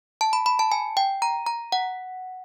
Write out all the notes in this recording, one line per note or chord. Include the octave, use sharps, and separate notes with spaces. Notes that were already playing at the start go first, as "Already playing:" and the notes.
A5
B5
B5
A5
G#5
G5
A#5
A#5
F#5